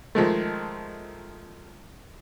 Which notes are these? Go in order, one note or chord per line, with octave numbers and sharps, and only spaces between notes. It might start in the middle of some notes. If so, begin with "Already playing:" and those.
D#3 F3 G#3 A3